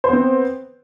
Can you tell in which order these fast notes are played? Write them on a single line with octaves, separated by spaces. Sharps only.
C5 B3 C4